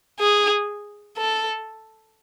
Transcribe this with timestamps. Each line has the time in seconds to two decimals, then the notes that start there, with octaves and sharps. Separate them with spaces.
0.20 G#4
1.18 A4